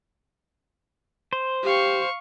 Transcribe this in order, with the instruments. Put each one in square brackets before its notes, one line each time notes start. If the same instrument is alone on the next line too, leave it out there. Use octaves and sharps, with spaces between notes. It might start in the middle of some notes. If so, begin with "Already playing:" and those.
[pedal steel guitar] C5
[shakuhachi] G4 [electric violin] F5 C#6